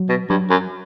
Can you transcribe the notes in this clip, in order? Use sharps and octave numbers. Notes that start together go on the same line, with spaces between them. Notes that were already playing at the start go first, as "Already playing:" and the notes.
Already playing: F#3
B2
G2 F#3
F#2